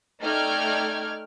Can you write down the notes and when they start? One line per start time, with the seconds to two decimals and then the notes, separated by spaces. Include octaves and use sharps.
0.21 A3 D#4 D5 G5 F6 G#6